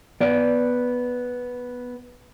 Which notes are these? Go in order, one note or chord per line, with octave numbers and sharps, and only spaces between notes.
B3 D5